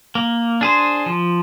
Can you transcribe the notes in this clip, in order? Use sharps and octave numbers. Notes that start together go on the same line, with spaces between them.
A#3
D4 G#4 C5
F3